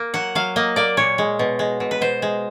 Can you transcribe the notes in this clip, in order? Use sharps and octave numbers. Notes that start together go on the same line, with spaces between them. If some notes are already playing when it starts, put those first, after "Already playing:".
Already playing: A#3
F#3 F#5
F#3 F5
A#3 D#5
A#3 D5
A#2 C#5
G#3
B2
G#3
B2
B4
B2 C5
G#3